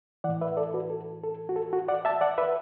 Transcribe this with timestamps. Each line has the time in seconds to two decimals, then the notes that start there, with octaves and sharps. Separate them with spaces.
0.24 E3 D5 F#5
0.29 A2
0.41 B4 E5
0.57 A4 D5
0.74 F#4 B4
0.90 A4
1.24 A4
1.49 F#4
1.56 A4
1.73 F#4
1.88 D5 F#5
2.05 E5 A5
2.21 D5 F#5
2.38 B4 E5